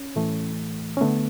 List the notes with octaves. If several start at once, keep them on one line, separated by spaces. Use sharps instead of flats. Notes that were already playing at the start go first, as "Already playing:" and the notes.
Already playing: C#4
A2 E3 A3
C#4
D3 A3 B3